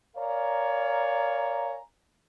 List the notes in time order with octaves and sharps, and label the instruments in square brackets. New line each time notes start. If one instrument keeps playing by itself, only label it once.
[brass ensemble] A#4 C#5 D5 F5 G#5 A#5